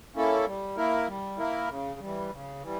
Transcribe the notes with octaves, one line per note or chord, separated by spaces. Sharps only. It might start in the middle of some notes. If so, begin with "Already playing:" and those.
A#3 C#4 E4 A4
G3
A#3 E4 A#4
G3
A#3 E4 A#4
C#3
E3 G3
C#3
E3 G3